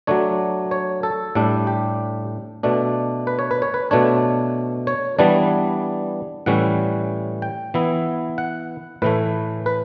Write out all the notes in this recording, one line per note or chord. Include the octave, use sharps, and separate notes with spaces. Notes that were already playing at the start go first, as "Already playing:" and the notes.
F#3 A3 D4 C#5
C#5
A4
A2 G3 D4
G4
B2 A3 D4
B4
C#5
B4
C#5
B4
B2 A3 D4 C#5
C#5
E3 G3 B3 D4 D5
A2 E3 G3 C#4 F#5
G5
E3 B3 E4
F#5
A2 E3 A3 B4
B4